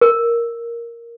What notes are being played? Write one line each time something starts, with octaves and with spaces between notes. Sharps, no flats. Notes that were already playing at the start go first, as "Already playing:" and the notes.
A#4